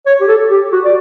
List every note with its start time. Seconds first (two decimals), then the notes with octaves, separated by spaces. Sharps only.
0.06 C#5
0.21 G4
0.28 A4
0.51 G4
0.72 F#4
0.85 D5